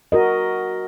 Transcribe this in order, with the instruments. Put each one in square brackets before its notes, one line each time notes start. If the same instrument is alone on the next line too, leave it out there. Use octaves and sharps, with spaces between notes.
[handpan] F#4 A#4 D#5